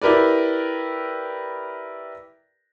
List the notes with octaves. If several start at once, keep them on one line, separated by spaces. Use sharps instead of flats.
E4 G4 A#4 B4 D5